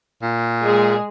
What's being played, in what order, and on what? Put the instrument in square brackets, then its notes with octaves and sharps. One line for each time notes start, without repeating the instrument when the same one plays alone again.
[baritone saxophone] A#2
[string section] G#3 G#4